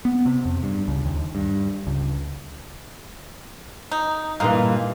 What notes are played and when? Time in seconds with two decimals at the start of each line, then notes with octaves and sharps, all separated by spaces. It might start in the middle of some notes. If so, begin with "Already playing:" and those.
0.05 B3
0.26 C3
0.45 F2
0.63 G2
0.88 C#2
1.05 D#2
1.35 G2
1.87 C#2
3.92 D#4
4.40 G2 A#2 E3 A#3 D#4